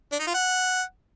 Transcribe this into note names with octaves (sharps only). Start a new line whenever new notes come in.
D4
D#4
F4
F#5